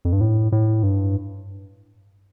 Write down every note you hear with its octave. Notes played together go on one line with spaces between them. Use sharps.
F2
G2
A2
A2
G2